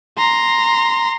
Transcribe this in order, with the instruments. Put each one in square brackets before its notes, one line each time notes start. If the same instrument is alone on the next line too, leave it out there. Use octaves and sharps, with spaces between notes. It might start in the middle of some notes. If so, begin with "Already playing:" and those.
[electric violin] A#5 C6